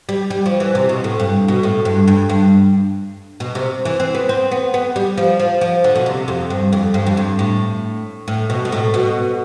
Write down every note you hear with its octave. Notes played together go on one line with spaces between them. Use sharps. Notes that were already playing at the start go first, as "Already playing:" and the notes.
G3
G3
F3
E3
C3
B2
A2
G2
B2
A2
G2
G2
G2
B2
C3
E3
C4
B3
C4
B3
B3
G3
F3
F3
F3
D3
B2
C3
F2
G2
F2
G2
F2
G2
A2
A2
B2
B2
A2
B2